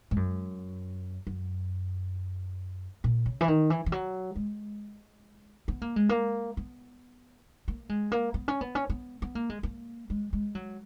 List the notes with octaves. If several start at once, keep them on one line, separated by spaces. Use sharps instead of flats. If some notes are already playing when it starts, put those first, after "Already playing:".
G#2
F#2
F#2
A#2
C#3
E3
D#3
E3
E3
F#3
G#3
B3
A#3
G#3
A#3
B3
A#3
G#3
A#3
B3
C#4
B3
C#4
B3
B3
A#3
G#3
A#3
G#3
G#3
F#3